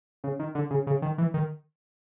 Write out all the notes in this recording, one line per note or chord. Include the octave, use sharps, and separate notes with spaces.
C#3
D#3
D3
C#3
C#3
D#3
E3
D#3